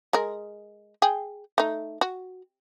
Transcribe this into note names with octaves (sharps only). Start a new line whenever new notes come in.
G#3 G#4 A#4
G#4 G5
A3 D#4
F#4